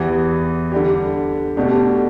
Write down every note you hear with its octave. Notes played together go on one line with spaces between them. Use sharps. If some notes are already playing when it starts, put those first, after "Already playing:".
Already playing: E2 E3 B3 G4
D3 G3 D4 G4
B2 A3 D4 G4